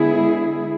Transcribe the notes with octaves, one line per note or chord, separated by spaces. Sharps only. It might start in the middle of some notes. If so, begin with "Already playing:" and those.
Already playing: D3 G#3 B3 E4 G#4